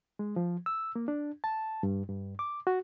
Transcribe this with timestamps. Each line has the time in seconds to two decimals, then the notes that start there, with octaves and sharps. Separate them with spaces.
0.19 G#3
0.36 F3
0.66 E6
0.96 A#3
1.08 D4
1.44 A5
1.83 G2
2.09 G2
2.39 D6
2.67 F#4